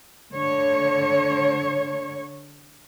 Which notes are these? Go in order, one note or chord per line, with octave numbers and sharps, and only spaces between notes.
D3 C#5